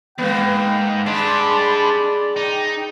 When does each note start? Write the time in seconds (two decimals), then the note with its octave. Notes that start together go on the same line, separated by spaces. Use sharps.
0.18 E2 G#2 A#3 B3 G5
1.06 G#3 D4 G4 D5 A5 B5
2.36 D#4 G5